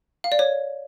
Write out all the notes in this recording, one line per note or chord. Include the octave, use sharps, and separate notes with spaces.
F5
D5
C#5